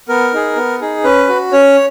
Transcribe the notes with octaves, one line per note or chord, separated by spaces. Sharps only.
B3 A#4
D#4 G#4
B3
D#4 G#4
C#4 B4
F#4
C#4 C#5